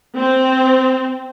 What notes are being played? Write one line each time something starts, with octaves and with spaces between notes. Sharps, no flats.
C4